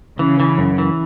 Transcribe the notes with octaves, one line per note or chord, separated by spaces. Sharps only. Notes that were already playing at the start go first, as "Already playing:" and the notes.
C#3 E3
E3
F#2
E3